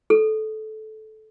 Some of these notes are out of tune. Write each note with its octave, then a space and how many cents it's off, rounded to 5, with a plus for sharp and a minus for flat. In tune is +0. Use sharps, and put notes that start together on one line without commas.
A4 -15